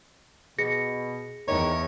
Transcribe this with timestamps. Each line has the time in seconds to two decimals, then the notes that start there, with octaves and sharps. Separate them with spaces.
0.58 B2 G#4 A#6 C#7
1.48 E2 D#3 C#5